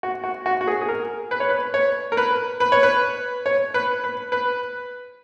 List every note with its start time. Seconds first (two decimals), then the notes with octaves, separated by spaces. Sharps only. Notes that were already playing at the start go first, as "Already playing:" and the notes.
0.03 F#4
0.24 F#4
0.46 F#4
0.61 F#4
0.67 G#4
0.82 G#4
0.89 A#4
1.31 B4
1.40 C#5
1.49 B4
1.74 C#5
2.12 A#4
2.17 B4
2.60 B4
2.72 C#5
2.83 B4
3.46 C#5
3.74 B4
4.04 B4
4.32 B4